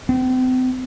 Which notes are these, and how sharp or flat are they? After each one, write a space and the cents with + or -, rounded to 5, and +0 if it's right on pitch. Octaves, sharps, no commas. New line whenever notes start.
C4 -40